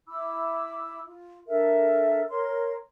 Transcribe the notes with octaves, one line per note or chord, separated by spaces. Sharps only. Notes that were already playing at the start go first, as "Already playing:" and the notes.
E4 B5 D6 E6
F4
D4 A4 A#4 E5
A#4 C#5 C6